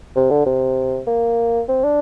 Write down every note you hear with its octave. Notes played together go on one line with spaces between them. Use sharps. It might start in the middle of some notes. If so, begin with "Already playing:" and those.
C3
D3
C3
A#3
C4
D4